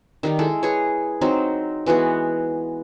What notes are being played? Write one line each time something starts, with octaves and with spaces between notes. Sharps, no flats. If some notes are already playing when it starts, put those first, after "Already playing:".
D#3 G3 D#4
G#3 E4 A4
G#4 B4 C#5
F#3 C4 D#4
E3 G#3 B3 F#4